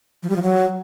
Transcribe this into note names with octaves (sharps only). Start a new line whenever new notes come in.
F3
G3
F3
F#3